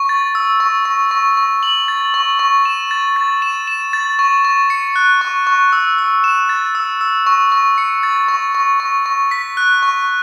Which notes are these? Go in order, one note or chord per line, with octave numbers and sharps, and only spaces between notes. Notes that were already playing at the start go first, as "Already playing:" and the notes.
Already playing: C#6
A6
E6
C#6
C#6
C#6
C#6
F#7
A6
C#6
C#6
E7
A6
A6
E7
E7
A6
C#6
C#6
C#7
F#6
C#6
C#6
E6
E6
E7
A6
E6
E6
C#6
C#6
C#7
A6
C#6
C#6
C#6
C#6
B6
F#6
C#6